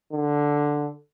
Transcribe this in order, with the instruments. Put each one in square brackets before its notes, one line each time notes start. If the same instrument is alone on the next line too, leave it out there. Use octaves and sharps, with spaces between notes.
[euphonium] D3